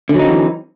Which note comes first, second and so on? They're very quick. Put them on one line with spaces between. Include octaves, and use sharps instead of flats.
D3 F#3 D#4 C4 E3